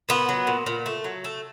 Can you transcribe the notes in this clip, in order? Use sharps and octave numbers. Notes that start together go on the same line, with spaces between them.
A#2 B3
F#3
A#2
A#2
A3
F#3
A3